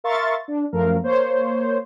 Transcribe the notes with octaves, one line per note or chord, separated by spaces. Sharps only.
A#4 E5 F5 C6 C#6 A6
D4
F#2 F3 A3 A#4 F5
A#3 C5 C#5